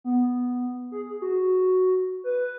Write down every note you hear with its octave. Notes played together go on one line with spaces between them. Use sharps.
B3
G#4
G#4
F#4
B4